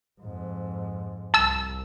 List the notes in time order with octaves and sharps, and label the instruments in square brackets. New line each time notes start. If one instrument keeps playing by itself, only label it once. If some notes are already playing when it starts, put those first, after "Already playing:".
[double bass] F2 G#2
[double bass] C2 [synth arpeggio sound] A5 E6